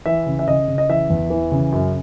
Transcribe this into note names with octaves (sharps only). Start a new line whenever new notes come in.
E3 E5
C#3
E5
C#3 D#5
C#3
D#5
E3 E5
E2
E3
C#3
F#2